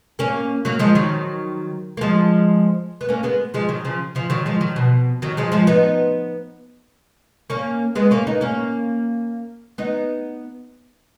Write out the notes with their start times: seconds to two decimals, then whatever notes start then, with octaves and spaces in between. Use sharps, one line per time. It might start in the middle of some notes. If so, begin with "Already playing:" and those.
0.19 A#3 C#4
0.65 F#3 A#3
0.79 F3 G#3
0.95 D#3 F#3
1.97 A#3
2.01 F3 G#3
3.01 B3
3.09 A#3 C#4
3.23 G#3 B3
3.54 F3 G#3
3.69 D#3 F#3
3.85 C#3 F3
4.15 C#3 F3
4.30 D#3 F#3
4.46 F3 G#3
4.61 D#3 F#3
4.76 B2
5.22 D#3 F#3
5.37 F3 G#3
5.52 F3 G#3
5.67 B3 D#4
7.50 A#3 C#4
7.95 G#3 B3
8.11 A#3 C#4
8.27 B3 D#4
8.41 A#3 C#4
9.78 B3 D#4